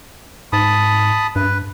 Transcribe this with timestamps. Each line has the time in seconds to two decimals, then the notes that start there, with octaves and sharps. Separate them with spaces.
0.53 G#2 A5 B5 D#6
1.36 G2 B4